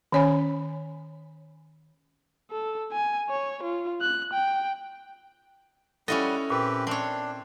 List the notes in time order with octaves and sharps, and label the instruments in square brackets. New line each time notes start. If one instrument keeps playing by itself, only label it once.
[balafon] D#3 C#4 C#5 G#5 B5
[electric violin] A4
G#5
C#5
F4
F#6
G5
[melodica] G3 F#5 [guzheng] C#4 E4 D#5 [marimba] A4
[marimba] A#2 [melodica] C4 G4 B4
[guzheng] C4 C#5 [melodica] D4